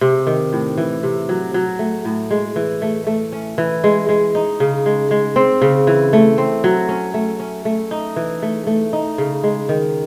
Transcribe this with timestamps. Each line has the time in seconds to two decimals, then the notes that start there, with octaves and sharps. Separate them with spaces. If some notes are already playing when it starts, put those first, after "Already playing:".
0.01 C3
0.27 D#3
0.53 A2
0.78 E3
1.03 C3
1.29 F#3
1.54 F#3
1.79 A3
2.05 A2
2.31 G#3
2.56 E3
2.82 A3
3.07 A3
3.33 C#4
3.58 E3
3.84 G#3
4.09 G#3
4.35 D#4
4.60 C#3
4.86 G#3
5.11 G#3
5.36 C4
5.62 C#3
5.87 E3
6.13 A3
6.38 C4
6.64 F#3
6.89 C#4
7.14 A3
7.40 C#4
7.65 A3
7.91 D#4
8.16 E3
8.42 A3
8.67 A3
8.93 D#4
9.18 C#3
9.43 G#3
9.69 D#3